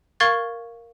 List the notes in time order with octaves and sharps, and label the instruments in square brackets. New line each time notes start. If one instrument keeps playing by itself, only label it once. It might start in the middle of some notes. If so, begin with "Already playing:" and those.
[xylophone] A#4 F5 C#6 G#6 A6